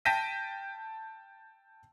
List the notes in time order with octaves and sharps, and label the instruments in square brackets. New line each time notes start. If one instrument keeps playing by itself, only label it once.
[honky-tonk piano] G5 A5 G6 A#6 B6 D#7